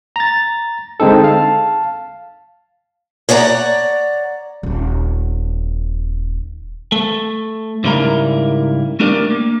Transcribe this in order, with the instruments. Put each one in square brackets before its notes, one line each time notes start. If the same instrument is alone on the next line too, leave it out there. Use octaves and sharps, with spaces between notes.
[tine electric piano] A#5 A6
D3 G#3 C4 D#4 A4
F5 A5
[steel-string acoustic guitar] C#5 D5 F#5 A5 A#5
[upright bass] D#1 C4
[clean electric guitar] A3
G#2 C#3 G3 E4 A#4 A#5
A3 D4 G4 A#4 D5
A#3